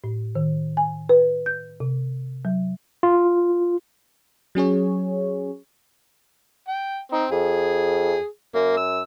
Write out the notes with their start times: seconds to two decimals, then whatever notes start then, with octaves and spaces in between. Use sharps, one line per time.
0.04 A2
0.35 D#3
0.77 G#5
1.09 B4
1.46 G6
1.80 C3
2.45 F#3
3.03 F4
4.55 F#3 C#4 G#4 C#5
6.68 G5
7.12 C4 D#4
7.31 F2 G#4
8.55 F#2 A#3
8.77 E6